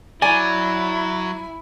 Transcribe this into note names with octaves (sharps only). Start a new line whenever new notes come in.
F#3 E4 D5 G#5